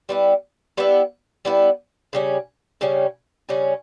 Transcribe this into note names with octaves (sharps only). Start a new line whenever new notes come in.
G3 B3 E4
G3 B3 E4
G3 B3 E4
C#3 G3 C#4
C#3 G3 C#4
C#3 G3 C#4